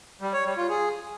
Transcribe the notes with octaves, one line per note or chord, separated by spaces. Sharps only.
G3
C#5
G3
F4
G#4